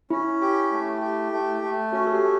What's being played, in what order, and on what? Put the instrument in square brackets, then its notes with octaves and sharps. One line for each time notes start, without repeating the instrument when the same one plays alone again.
[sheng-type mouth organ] C#4 [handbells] E4
[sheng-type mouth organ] G4
A3
G4
A3
A3
[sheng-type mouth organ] C#4 [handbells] F#4
[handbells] A4
G4
[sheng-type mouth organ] A3